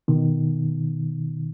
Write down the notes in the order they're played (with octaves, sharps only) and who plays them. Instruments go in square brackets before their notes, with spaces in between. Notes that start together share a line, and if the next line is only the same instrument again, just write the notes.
[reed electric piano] B2 D#3